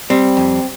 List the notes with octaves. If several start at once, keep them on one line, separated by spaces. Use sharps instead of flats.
G3 C4
F2